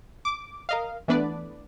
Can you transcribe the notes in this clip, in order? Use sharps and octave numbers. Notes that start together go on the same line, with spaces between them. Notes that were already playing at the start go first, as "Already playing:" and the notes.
D6
A#4 D#5 F5
E3 A3 B3 D4 B4 D5